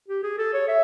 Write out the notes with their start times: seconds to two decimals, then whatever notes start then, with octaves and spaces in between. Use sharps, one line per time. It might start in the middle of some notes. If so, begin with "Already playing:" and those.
0.08 G4
0.23 G#4
0.38 A4
0.53 C#5
0.68 E5